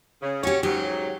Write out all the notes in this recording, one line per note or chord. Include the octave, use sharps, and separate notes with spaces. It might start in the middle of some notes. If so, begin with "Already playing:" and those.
C#3
C#4 F#4 G4 C#5
G#2 C#3 F#3 G4